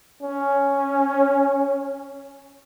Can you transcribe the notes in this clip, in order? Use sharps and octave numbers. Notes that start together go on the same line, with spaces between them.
C#4